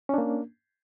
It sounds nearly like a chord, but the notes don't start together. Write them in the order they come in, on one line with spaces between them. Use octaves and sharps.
C#4 D4 A#3